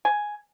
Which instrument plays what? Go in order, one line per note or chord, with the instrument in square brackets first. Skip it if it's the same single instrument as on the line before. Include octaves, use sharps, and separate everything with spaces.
[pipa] G#5